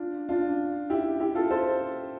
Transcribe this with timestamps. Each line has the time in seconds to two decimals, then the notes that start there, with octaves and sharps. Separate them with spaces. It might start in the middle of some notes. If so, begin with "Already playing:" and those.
Already playing: D4 F4
0.29 D4 F4
0.90 E4 G4
1.20 E4 G4
1.35 F4 A4
1.51 A4 C5